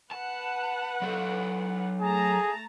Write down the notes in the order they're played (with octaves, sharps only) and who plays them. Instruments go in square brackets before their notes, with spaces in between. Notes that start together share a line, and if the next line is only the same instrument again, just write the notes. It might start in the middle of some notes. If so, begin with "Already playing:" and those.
[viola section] B4 F#5 [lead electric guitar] A5
[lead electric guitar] F#3 A4
[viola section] A3 A5 A#5 [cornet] G#4